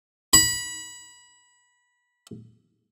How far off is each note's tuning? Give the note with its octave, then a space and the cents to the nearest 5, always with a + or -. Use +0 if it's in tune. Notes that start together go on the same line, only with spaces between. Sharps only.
B5 -25